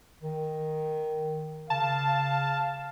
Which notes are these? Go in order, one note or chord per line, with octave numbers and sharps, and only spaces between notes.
D#3
C#3 F5 A5